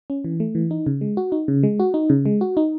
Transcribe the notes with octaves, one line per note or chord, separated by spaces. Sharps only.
C#4
E3
A3
E3
D#4
C#3
G#3
F#4
D#4
C#3
G#3
F#4
D#4
C#3
G#3
F#4
D#4